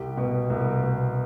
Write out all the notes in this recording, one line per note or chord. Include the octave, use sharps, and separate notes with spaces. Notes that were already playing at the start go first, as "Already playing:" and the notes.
Already playing: C2 G4
B2
C2
B2